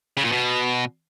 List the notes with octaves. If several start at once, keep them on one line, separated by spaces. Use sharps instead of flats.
C#3
A#2
B2